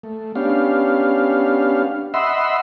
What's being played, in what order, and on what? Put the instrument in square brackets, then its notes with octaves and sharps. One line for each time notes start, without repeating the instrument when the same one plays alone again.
[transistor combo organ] A3
B3 C#4 D4 G4 F5
D#5 E5 F#5 B5 C6 E6